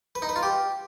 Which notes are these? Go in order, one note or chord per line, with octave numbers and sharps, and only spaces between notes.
B4
D#4
B4
F4
G4